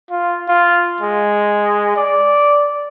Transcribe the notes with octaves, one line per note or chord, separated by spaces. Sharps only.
F4
F4
G#3
D5